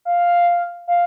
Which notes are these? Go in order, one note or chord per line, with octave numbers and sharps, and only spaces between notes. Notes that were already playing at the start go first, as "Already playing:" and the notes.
F5
F5